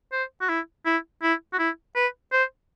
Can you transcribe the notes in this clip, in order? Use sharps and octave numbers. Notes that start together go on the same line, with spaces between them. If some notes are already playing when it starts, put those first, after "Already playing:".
C5
F#4
E4
E4
E4
F#4
E4
B4
C5